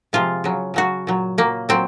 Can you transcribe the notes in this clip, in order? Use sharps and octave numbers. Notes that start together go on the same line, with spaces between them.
C3 F3 G#3 F4
C#3 F#3
C#3 F#3 F#4
A#2 F#3
A#2 F#3 A#3
A#2 F#3 C4